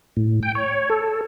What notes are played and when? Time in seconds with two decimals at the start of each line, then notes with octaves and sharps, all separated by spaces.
0.17 A2
0.43 G5
0.55 C#5
0.90 A4